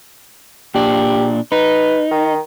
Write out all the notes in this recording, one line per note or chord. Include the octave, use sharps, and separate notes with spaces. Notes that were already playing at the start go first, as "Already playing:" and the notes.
A#2 D4 G4
D#4 B4
D#3